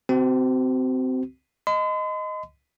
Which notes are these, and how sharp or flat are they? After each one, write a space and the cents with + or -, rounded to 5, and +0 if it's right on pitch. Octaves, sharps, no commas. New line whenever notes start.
C4 -20 F#4 +35
D#5 +0 C6 -45